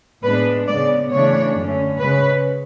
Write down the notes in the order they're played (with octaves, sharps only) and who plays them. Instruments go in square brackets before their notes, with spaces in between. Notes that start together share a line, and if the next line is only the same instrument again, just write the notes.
[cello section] A2 G#3 B3 D4 B4
C#3 G#3 B3 D5
C#3 E3 A3 D4 C#5
F#2 D3 A3 C#4
C#3 G#3 C#4 B4